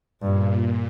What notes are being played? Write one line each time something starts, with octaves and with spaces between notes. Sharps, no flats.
G2 A#2